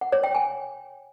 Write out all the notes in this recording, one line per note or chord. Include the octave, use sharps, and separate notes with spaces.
F#5
C#5
G5
G#5